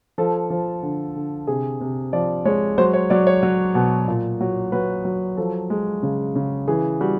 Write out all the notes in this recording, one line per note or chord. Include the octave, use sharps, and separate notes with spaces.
F3 A4
F3
D3
D3
C3 G#4
C3
F3 D5
G#3 C#5
F#3 C5
C#5
F#3 D5
C#5
F#3
B2
A#2
F#3
F#3 B4
F#3
F3 A4
G#3
C#3
C#3
E3 G#4
G3 F#4